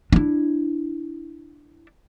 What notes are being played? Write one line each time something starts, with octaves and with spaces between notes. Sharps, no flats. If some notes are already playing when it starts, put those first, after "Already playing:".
D4 E4